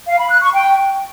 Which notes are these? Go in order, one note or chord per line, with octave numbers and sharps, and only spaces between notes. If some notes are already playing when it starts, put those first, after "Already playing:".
F5
B5
F#6
C#6
G5